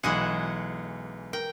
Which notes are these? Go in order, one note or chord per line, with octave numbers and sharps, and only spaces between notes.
B1 E3 G#3 F#5 G#5 D#7
A#4 G5